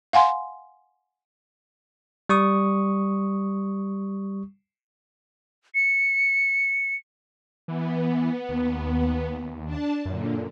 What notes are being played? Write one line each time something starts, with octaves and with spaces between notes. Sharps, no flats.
F5 F#5 G#5 C6
G3 C#6 D#6
C#7
E3 B3
D#2
D4 A5
F#2 A#2 D3